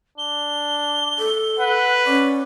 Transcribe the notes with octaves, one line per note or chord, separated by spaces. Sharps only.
D4 G7
A4
B4 F#5
C#4 D5